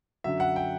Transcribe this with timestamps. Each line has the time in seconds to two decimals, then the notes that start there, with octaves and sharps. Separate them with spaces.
0.24 F#2 D3 F#3 E5
0.40 F#5
0.56 G5